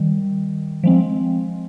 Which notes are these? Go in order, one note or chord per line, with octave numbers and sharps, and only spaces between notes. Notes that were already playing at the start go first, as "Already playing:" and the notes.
Already playing: D#3 G3
F3 G#3 C4